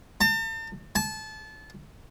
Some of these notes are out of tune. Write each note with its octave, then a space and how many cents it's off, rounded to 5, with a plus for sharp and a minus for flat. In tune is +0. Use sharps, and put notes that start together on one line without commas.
A5 +40
A5 -25